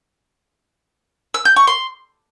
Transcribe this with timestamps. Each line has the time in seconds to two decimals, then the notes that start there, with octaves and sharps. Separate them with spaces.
1.34 E6
1.45 G6
1.56 C#6
1.67 C6